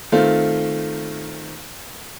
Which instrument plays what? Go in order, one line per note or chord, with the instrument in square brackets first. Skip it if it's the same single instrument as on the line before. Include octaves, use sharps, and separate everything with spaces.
[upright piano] D#3 A3 C4 F4